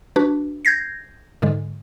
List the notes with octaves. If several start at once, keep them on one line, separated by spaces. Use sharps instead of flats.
D4 F#4 B4
G6 G#6 A#6 C7
G#2 D3 G#3